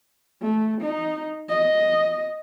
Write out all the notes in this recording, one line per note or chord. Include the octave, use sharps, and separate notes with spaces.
A3
D#4
D#5